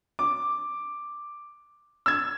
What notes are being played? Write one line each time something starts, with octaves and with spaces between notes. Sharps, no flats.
D6
E6 G#6